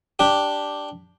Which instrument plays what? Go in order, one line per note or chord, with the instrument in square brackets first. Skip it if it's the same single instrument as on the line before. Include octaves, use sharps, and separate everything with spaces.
[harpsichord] D4 G4